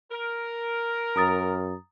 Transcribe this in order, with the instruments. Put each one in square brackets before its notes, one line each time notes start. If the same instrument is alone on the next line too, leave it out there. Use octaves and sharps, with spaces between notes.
[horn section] A#4
[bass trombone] F#2 [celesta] A#5 D#6 A6